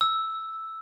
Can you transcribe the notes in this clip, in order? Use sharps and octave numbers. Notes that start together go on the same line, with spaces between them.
E6